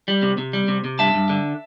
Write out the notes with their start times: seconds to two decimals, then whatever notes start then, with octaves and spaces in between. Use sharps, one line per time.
0.08 G3
0.22 C3
0.38 C3
0.53 G3
0.68 C3
0.84 C3
0.99 G2 E5 A5
1.14 G2
1.29 D3